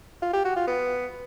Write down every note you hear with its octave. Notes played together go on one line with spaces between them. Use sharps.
F4
G4
F#4
F4
B3